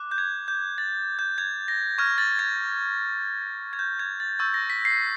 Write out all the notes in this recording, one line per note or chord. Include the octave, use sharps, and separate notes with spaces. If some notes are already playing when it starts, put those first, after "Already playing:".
Already playing: D6 F#6
G6
G#6
G6
A6
G6
G#6
A#6
C#6 F6 G#6
A6
G#6
G#6
G6
G#6
A6
C#6 E6 G6 A6
A#6
B6
C7